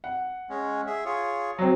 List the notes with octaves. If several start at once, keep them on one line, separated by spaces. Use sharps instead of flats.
F#5
G#3 C#4
G#4 E5
F4 G#4 C#5
F#3 C4